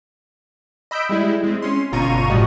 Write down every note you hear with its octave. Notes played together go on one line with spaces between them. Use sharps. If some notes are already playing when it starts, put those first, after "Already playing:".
D#5 B5 E6 G6 B6 D7
G3 G#3 E4
G#3 C4
C#4 C6
G1 B2 F4 A#5 C#6 D#7
A2 F3 G3 F#4 D#5